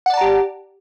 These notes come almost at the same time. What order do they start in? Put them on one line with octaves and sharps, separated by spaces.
F#5 D5 A5 A#5 G4